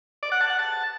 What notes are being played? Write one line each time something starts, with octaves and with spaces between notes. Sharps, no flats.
D5
F#5
A5
F#5
A5